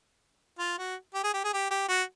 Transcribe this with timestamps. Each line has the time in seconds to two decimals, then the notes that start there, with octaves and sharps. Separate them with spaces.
0.59 F4
0.78 F#4
1.14 G4
1.24 G#4
1.34 G4
1.44 G#4
1.54 G4
1.71 G4
1.89 F#4